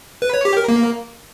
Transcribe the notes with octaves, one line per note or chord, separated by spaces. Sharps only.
B4
C#5
G4
A#4
A#3